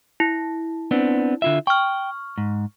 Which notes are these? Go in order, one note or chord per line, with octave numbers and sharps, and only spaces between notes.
E4
B3 C4 D4
D3 F4 E5
G5 C#6 F6
G#2